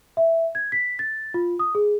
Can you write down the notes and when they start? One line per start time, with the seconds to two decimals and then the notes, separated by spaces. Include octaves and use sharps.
0.17 E5
0.55 G#6
0.72 B6
0.99 A6
1.34 F4
1.59 D#6
1.75 G#4